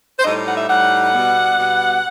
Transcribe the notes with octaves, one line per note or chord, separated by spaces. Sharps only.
C5
A2 G3 D#4 D#5
F#5
E5
A2 G3 D#4 F#5
B2 G3 B3
B2 G3 B3